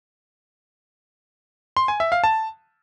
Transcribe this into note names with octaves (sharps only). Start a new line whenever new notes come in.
C6
G#5
E5
F5
A5